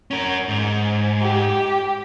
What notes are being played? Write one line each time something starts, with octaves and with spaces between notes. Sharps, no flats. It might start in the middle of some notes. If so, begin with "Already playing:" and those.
C#4 A#4
G#2
G4